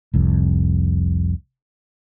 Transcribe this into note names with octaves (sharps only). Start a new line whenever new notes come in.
F1 C2 F2